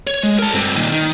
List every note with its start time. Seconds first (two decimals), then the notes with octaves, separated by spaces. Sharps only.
0.07 C#5
0.23 G#3
0.39 A#4 A5
0.54 G2 C4
0.75 A#2 D#3
0.92 D#3